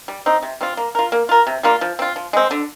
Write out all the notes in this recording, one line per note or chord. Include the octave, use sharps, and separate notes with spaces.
G3
C4 D#4
C3
G3 C4 F4
A#3
F4 A#4
A#3
F4 A#4
C3
G3 A#3 F4
F3
C4 F4
F3
G#3 C4
D3